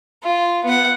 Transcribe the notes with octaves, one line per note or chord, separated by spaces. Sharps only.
F4
B3 F#5